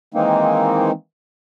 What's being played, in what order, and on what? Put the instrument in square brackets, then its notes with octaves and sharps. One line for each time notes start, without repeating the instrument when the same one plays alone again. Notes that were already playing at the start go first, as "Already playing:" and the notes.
[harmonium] D#3 E3 G#3 A#3 C4 D#4